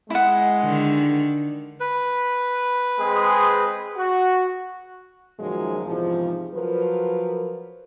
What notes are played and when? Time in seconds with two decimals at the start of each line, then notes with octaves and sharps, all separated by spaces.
0.10 G#3 E4 F#5
0.61 D3 D#3
1.80 B4
2.98 G#3 C4 G#4
3.97 F#4
5.39 F#2 A#2 D#3 F3 F#3 G#3
5.85 E2 G#2 C3 E3 F3
6.54 F3 F#3 A#4 B4